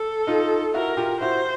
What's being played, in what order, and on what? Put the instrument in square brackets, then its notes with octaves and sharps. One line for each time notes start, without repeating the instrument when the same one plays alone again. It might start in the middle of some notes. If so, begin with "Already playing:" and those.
Already playing: [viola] A4
[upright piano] D#4 F4
[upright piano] E4 F#4 [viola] A#4
[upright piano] F4 G4
[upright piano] E4 F#4 [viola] C5